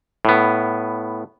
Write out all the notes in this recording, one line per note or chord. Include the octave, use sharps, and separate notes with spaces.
A2 B3